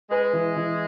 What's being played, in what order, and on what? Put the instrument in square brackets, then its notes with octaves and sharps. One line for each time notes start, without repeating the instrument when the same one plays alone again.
[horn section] G#3 [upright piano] B4
[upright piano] E3
E3